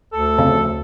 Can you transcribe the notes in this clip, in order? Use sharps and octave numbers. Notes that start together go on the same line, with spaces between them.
D2 A4
F2 C#3